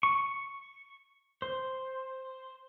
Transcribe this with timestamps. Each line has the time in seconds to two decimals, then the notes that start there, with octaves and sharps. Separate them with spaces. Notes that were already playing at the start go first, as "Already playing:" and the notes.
0.03 C#6
1.42 C5